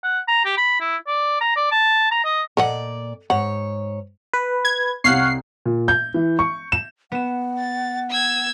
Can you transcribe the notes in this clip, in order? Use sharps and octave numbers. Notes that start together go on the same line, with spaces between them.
F#5
A#5
G4
B5
E4
D5
A#5
D5
A5
A#5
D#5
A#2 A4 D5 D#5 F#5
G#2 C#5 F#5
B4
G#6
C2 C3 C#5 F5 F#5 C7
A#2
G6
E3
C#6
E7
B3 F#5 E7
A6
E6 G#6